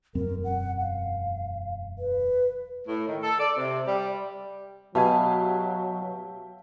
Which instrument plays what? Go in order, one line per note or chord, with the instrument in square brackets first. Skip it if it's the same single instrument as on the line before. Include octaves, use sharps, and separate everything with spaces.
[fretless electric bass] E1 F#2 C4 [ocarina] A#4
[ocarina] F#5
F5
B4
[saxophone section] A2
D#3
A4
D5
C3
G3
[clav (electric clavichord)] B2 G#5 [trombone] F#3 [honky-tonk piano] G4 E5 F5 [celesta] A5